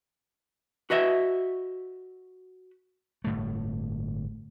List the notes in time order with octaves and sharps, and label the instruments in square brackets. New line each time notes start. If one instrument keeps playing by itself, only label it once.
[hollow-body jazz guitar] F#4 B4 D#5 E5
[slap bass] G1 A2 A3